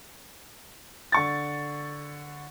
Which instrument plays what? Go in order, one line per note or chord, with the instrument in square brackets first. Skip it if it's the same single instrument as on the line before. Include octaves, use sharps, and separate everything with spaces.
[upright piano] D3 C#6 A6